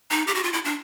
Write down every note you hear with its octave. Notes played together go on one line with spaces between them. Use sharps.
D#4
G4
F#4
F4
E4
D4